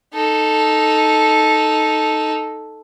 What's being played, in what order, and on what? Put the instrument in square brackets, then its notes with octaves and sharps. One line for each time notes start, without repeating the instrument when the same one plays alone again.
[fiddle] D#4 A4